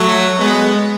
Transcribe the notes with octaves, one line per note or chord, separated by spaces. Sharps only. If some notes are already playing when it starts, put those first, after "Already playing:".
Already playing: F#3 A3
G#3 B3